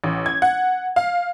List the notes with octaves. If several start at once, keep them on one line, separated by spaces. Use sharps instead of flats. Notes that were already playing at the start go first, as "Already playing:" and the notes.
A1
G#6
F#5
F5